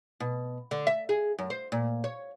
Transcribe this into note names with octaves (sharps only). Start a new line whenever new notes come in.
B2
D3
E5
G#4
F#2
C5
A#2
C#5